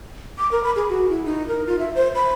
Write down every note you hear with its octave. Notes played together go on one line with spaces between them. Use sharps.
D6
A#4
B5
G#4
F#4
E4
D#4
A#4
F4
E5
C5
B5